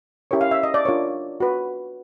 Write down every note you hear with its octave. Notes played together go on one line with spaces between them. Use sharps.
C#4 E4 G4 A#4 C#5
F5
E5
D#5
D5
D4 F4 A#4 C#5
F#4 B4